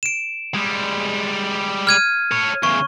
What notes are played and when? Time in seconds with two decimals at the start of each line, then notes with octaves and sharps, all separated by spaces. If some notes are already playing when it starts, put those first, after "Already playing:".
0.03 D7 E7
0.54 G3 G#3
1.87 F6 G#6 D#7
2.32 A4 C#5
2.63 E2 C#3 C#6